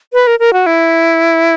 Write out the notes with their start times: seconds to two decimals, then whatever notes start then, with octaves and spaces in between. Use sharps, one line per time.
0.13 B4
0.27 A#4
0.39 A#4
0.53 F#4
0.66 E4